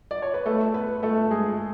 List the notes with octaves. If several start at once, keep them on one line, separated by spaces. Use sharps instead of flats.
D5
C#5
B4
A3 A4
B3 B4
A3 A4
G#3 G#4